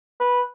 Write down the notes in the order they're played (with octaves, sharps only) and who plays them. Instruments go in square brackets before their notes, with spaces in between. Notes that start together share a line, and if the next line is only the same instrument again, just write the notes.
[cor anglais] B4